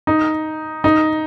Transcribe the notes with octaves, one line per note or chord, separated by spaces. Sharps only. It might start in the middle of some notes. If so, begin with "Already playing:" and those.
D#4
D#4